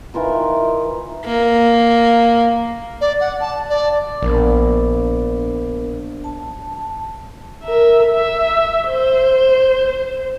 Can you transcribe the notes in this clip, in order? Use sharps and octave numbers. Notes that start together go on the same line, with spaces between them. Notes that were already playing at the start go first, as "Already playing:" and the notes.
D#3 E3 F4 A#4
A#3
D5
F#5
A5
D5
A#1 B3 D4 A#4
A5
A#4 E5
E5
C5